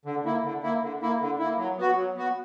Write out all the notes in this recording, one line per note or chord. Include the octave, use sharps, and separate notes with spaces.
D3
A#3 E4
D3
A#3 E4
D3
A#3 E4
D3
A#3 E4
F#3
B3 F#4
F#3
B3 F#4